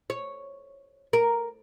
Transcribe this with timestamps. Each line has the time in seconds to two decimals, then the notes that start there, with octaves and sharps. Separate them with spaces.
0.10 C#5
1.13 A#4